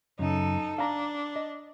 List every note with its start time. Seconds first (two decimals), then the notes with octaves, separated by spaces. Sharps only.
0.19 F#2 C#3 D#4 A4
0.78 D4 F5 A#5
1.36 D#5